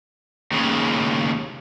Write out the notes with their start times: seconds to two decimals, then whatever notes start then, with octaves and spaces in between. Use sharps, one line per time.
0.51 D#2 C#3